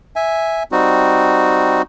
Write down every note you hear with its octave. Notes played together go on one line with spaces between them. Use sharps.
E5 G#5
G3 C4 D#4 F#4